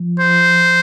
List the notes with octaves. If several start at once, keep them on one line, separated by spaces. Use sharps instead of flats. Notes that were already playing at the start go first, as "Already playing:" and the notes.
Already playing: F3
C5